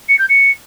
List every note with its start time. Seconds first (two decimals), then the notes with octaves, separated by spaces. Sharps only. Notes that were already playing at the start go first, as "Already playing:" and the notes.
0.08 C#7
0.19 G6
0.29 C#7